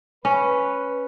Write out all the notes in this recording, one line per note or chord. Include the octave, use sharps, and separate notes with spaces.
C#4 B4